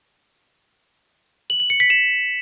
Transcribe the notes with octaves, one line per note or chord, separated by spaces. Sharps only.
F#7
F#7
C#7
B6
E7